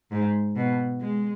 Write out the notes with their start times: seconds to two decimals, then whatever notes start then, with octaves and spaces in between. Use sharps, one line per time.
0.11 G#2
0.56 B2
1.01 G#3